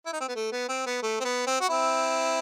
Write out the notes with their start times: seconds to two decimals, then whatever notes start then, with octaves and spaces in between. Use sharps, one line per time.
0.06 E4
0.13 D#4
0.20 C4
0.28 B3
0.35 A3
0.52 B3
0.69 C4
0.86 B3
1.02 A3
1.20 C4
1.24 B3
1.47 C4
1.61 F#4
1.69 C4 E4